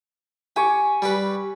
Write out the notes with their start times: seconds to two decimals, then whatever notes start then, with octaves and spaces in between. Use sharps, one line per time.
0.56 G4 G#5 C#6
1.02 G3 G4 B4